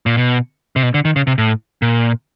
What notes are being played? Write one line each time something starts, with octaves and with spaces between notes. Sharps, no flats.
A#2
B2
C3
B2
D3
D#3
C#3
C3
A2
A#2